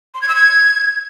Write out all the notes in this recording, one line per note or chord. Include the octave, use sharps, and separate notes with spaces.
C6
G#6
E6
G#6